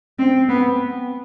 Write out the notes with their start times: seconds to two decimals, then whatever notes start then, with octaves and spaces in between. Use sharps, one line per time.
0.18 C4
0.49 B3